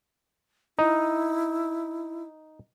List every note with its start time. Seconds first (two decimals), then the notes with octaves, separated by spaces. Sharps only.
0.79 D#4 E4